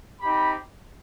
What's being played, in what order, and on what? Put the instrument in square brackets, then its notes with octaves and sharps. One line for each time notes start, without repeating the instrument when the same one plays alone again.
[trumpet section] C4 D#4 G4 B5